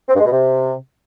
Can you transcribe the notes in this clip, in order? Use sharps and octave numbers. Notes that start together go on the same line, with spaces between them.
C4
G2
G#3
B2
C3